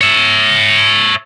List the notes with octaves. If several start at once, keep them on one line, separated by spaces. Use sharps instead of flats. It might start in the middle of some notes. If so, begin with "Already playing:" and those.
C#5 E5